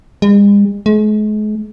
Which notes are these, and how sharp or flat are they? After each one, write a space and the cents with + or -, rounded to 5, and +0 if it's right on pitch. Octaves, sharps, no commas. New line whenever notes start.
G#3 -45
G#3 +40